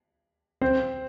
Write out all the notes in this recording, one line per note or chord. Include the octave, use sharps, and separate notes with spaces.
C4 C5